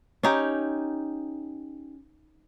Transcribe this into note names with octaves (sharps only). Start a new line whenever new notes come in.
C#4 D#4 G4